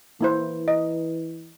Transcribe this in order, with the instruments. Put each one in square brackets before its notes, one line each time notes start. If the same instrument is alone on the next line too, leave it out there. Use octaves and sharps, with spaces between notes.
[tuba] E3 [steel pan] A#3 E4 C5
[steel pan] D#5